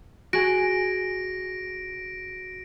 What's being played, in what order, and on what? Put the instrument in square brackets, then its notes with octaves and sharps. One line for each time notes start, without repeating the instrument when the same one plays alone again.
[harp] F#4 G#4 [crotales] A#6 D7